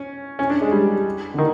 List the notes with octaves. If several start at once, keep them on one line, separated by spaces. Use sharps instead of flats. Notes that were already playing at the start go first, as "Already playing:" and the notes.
Already playing: C#4
C#4
D4
G#3
G3
D3
D#3